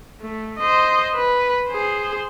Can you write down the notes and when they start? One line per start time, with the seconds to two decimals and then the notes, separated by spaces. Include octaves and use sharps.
0.21 A3
0.59 C5 D#5
1.15 B4
1.69 G#4 C5